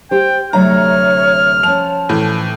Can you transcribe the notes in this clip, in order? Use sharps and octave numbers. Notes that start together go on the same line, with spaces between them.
G4 C5 G5
D2 C3 F#3 C#5 A#5 F6
F3 C#4 A5 F7
A2 E3